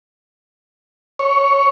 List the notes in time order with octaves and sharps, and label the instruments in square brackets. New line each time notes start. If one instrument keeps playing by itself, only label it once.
[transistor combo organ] C#5